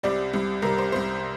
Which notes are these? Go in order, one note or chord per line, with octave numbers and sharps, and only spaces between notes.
C2 C3 G3 D5
C2 C3 G3
C2 C3 G3 A#4
C5
C2 C3 G3 C5